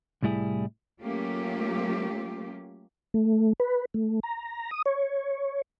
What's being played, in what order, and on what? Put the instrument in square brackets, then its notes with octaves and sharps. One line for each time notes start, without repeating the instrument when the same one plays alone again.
[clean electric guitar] C2 A2 G3 E4 G#4
[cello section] F#3 A3 A#3 C#4 F4 G4
[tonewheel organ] A3
B4
A3
A#5
D#6
C#5